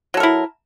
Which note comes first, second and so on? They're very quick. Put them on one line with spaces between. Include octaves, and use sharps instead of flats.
F#3 A4 A#4 E4